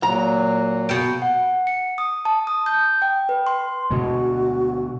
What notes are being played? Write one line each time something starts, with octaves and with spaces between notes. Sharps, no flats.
A#2 F#3 A#5
B2 G5
F#5
C#7
D#6
A5
D#6
G6
G5
B4
C6
D2 B2 G#3 F#4